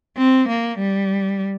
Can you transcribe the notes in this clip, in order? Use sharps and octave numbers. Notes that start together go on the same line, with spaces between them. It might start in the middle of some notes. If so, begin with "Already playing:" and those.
C4
A#3
G3